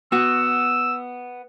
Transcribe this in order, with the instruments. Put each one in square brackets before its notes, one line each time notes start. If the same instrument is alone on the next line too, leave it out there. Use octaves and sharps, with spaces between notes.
[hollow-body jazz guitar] B3 F#4 [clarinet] E6